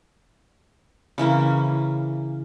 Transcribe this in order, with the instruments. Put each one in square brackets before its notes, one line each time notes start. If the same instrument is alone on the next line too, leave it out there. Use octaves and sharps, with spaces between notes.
[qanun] C#3 E3 A#3 C#4